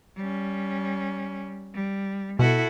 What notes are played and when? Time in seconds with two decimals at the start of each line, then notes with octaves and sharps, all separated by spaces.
0.17 G3 C#4
1.74 G3
2.39 B2 E4 F#4 A4